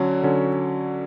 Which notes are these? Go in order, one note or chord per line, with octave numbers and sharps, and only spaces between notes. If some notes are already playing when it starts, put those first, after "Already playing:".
Already playing: D3 F#3 C#4
D3 F#3 C#4